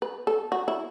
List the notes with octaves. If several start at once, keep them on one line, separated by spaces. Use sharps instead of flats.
B4
A4
F#4
E4